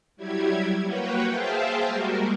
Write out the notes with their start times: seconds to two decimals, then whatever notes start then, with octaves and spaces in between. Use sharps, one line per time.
0.16 F#3 G3 E4 G4 G#6
0.82 A#3 F#4 B4 C#5 F#5 G5
1.27 G#4 C5 E5 F5 G5 A5
1.87 G3 G#3 A#3 F#4 A#4